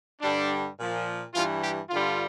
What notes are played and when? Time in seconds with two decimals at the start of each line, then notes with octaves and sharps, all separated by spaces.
0.21 G2 D3 G3 D4
0.78 A#2 F3
1.34 G2 E3 G3 F4
1.63 G4
1.90 G2 D3 G3 F4